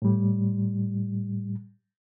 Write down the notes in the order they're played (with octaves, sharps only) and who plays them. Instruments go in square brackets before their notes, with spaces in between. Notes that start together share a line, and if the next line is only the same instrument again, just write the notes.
[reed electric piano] A2 G3